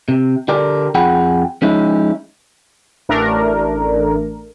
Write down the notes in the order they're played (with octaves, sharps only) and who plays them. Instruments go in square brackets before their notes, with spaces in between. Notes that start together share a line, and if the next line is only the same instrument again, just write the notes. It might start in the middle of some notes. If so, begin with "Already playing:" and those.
[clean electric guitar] C3
D3 G4 A#4 D5
F2 F4 G#4 F#5 G5 B5
F3 G#3 C#4 D#4 E4
[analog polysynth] A1 A3 D4 A#4